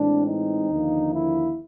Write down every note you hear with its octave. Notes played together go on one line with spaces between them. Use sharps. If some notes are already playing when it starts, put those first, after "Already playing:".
Already playing: A2 E3 G#3 C4 D4
D#4
D#2 D3 F3 A#3
E4